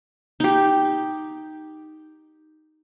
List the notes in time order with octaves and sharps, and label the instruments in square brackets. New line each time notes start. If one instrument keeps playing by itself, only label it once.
[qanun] D#4 G4